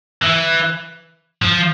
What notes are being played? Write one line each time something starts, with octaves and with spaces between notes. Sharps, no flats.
E3
F3